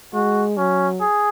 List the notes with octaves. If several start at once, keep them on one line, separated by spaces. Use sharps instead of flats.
G#3 F#4
F#3 C#4
G#4